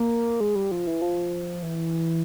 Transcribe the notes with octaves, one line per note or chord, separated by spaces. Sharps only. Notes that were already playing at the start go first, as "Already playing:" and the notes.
Already playing: A#3
G#3
G3
F3
E3
F3
E3